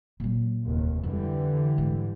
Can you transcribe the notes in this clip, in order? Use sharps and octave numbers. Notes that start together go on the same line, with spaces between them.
A#2 F#3
F1 D#2
F2 D3 E3 G3
G#2